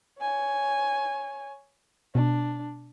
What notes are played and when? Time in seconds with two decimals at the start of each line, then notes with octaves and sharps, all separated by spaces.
0.21 C#5 G#5
2.15 B2 D4